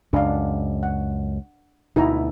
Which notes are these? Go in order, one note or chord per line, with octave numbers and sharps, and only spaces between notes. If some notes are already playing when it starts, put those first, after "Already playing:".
C#2 F#2 D4 F5
F#5
D2 B2 D#4 E4 A#5